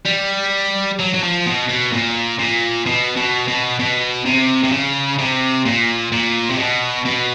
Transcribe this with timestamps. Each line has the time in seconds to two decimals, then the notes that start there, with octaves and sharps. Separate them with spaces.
0.06 G3
0.99 F#3
1.14 F#3
1.23 F3
1.47 B2
1.69 B2
1.92 A#2
2.39 A#2
2.86 B2
3.17 B2
3.48 B2
3.80 B2
4.26 C3
4.64 C3
4.72 C#3
5.19 C3
5.65 A#2
6.12 A#2
6.51 C3
6.59 B2
7.05 B2